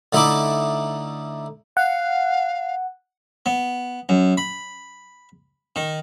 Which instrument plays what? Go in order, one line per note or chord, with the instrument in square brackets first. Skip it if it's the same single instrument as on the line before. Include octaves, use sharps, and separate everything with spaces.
[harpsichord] D3 A3 D#4 E4 B5 D6
[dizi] F5 [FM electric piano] F#5
[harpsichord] B3
F#2
B5
D#3